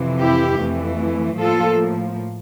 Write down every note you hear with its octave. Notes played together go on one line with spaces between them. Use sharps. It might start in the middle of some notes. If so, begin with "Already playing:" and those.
Already playing: F2 C3 E3
E4 G4
F2 E3 A3
A2 F3 A#3 F4 A4